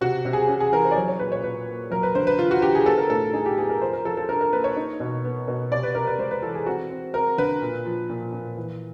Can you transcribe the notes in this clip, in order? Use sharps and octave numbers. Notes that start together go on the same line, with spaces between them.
C3 F#4
C3
G#4
C#4 G#4
G#4
E3 A#4
C5
D5
F#3 C#5
C#5
A#2 B4
C#5
A#2 B4
A#3
F#3 A#4
B4
D3 C5
B4
D3 F4
F#4
D3 G4
G#4
B3 A4
A#4
A2 A4
D#4 G#4
G4
B3 G#4
A#4
F3 C5
A#4
F3 A4
A4
D4 A#4
A#4
A#3 B4
C#5
D#4
B2
B3
B2
C3 D5
B4
C3 A#4
B4
G#3 C5
B4
E3 A4
G#4
C4 F#4
C4
C4 A#4
D3 B4
A#2
F3
A#2
A#2
E3